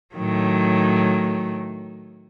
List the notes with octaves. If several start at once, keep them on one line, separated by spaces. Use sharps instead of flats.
A2 D#3 F#3